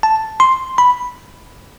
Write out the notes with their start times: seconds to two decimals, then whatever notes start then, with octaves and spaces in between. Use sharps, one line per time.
0.03 A5
0.40 C6
0.78 B5